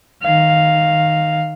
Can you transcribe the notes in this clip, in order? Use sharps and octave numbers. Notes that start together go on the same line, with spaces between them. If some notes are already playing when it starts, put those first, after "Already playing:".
D#3 F5